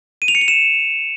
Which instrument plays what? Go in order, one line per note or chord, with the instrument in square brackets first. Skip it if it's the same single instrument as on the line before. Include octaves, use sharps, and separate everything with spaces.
[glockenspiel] D#7
F7
C#7
F7
E7